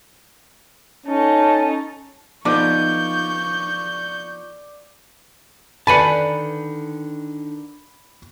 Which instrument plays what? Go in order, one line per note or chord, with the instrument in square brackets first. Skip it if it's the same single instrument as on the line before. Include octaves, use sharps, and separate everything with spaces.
[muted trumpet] C#4 [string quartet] D#4 A4
[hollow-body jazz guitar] F3 B3 D#4 [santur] D5 [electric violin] C#6 G6
[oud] D3 D#3 [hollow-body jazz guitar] B4 G#5 A5 [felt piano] B5 C#7